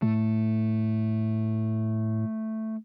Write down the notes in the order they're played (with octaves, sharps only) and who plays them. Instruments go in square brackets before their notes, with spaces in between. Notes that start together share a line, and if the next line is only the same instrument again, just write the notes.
[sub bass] A2 [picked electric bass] A3